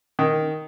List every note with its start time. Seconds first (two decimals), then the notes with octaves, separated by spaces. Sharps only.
0.19 D#3